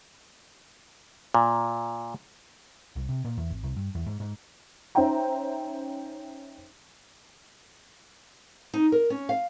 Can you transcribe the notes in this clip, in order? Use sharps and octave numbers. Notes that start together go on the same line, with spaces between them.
A#2
C2
C3
A#2
E2
G#1
C2
G2
E2
G#2
G#2
C#4 D#4 C5 E5 G5 A#5
D#4
A#4
C#4
F5